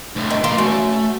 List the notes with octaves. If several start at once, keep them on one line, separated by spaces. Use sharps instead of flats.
D2 A2
D#3
E3 A#3 C6
F#2 A3